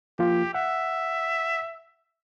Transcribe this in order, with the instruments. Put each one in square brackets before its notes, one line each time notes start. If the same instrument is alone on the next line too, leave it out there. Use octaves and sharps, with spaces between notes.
[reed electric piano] F3 A#3 F4 [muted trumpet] G4
[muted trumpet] E5 [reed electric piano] F#5